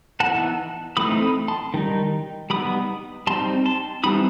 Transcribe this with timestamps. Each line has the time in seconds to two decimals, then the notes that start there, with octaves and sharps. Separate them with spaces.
0.20 E3 B3 D#4 F#5 A5
0.97 E3 A3 C4 D#4 B5 D#6
1.22 B5 D#6
1.48 A5 C6
1.74 D#3 G3 D#4
2.50 G3 B3 D#4 B5 D#6
3.27 G3 C4 D#4 A5 C6
3.66 A5 C6
4.04 E3 G3 C4 D#4 B5 D#6